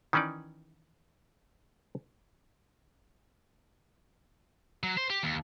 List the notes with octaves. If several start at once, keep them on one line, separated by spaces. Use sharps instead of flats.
D#3 E3 C#4 D#4 D5
F#3
C5
G4
D#2